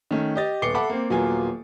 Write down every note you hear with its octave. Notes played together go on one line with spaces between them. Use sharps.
D#3 A3 C#4
G4 D#5 A6
D#1 B3 D6 C7 C#7 G7
A4 E5 F#5 B5 D6
A#3 C4
D#1 F#3 A#3 B3 F4 G#5